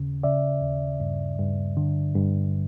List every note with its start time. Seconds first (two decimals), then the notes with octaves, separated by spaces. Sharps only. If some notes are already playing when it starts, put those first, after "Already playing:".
Already playing: D#2 C#3
0.23 C#3 D5 E5
0.61 D#2
1.00 G2
1.39 G2
1.77 D3
2.16 G2